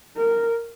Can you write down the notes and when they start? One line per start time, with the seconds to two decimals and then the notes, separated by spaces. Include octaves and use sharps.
0.17 A#4